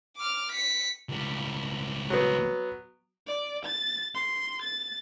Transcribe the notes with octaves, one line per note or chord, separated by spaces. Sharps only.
D6 F6
B6 C#7
C#2 G3
F#3 B3
D5
A6
C6
A6